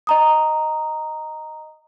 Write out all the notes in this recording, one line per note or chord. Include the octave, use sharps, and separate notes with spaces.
D#5 A#5 D#6